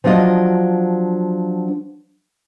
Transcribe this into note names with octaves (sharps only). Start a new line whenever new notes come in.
F3 F#3 D4 F4 D#5